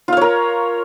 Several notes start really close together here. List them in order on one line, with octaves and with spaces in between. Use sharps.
F4 F5 C#5 A#4